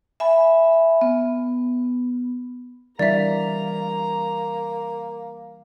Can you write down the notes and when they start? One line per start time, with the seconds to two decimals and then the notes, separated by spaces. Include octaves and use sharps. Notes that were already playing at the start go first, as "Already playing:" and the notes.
0.20 E5 G#5 B5
1.01 B3
2.99 E3 G3 A#3 D4 D5 E5 A#5